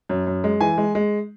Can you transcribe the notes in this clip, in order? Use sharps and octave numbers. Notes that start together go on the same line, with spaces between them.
F#2
F#2
G#3
E3 G#5
G#3
G#3